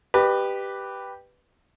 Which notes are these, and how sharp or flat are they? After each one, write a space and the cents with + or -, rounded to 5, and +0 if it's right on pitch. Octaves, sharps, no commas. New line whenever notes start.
G4 +0 B4 +0 D#5 -45